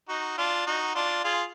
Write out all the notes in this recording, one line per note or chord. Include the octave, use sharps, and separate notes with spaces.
D#4 F#4
D4 F4
D#4 F#4
D4 F4
F4 G#4